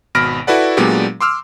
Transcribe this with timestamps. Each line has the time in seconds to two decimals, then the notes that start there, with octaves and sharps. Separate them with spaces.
0.15 G#1 B2 B5 F6 A#6 D7
0.47 E4 F#4 A4 B4 D5 F#5
0.77 A#2 F#3 G#3 B3 D4 G4
1.21 C6 D6 E6 F6